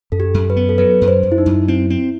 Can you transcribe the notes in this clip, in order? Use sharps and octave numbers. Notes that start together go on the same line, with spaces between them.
F#2 A4
G4
F#2
B4
B3
A4
F#3 B4
F#2
C5
F#2
E4
D#4
F#2
C4 E4
C4